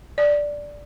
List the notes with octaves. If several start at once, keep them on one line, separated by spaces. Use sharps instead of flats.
D5